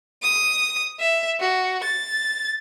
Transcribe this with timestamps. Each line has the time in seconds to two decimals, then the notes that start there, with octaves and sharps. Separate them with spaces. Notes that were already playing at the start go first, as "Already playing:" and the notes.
0.23 D#6
1.00 E5
1.40 F#4
1.84 A6